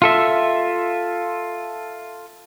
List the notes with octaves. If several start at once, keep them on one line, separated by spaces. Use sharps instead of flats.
F4 A4 E5